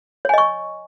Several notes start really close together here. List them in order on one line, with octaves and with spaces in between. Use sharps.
C#5 G#5 D#5 C#6